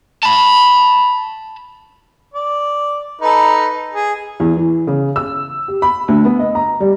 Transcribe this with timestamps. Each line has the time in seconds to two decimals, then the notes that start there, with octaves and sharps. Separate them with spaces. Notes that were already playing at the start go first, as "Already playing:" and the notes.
0.23 A5 B5
2.34 D5
3.21 D#4 A4 B4
3.94 G#4
4.40 E2
4.57 E3
4.87 C#3
5.16 E6
5.68 G4
5.82 B5
6.08 D2
6.25 B3
6.39 D#5
6.55 A#5
6.80 G3